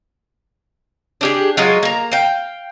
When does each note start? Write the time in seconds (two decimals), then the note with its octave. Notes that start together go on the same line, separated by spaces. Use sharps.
1.21 D4 G4 G#4
1.57 F#3 G#3 F4 D#5
1.83 A#3 A#5
2.12 F5 G5